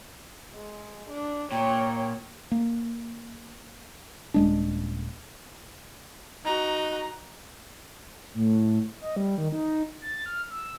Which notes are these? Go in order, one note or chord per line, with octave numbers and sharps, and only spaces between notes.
G#3
D4
A#2 C#5 G5
A#3
D#1 G#3 D4
D#4 F#4 A#5
A2
D#5
G3
D#3
D#4
A6
F6
E6